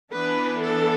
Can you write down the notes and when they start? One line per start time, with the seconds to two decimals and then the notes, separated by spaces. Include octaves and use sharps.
0.11 E3 B3 D4 B4
0.60 A4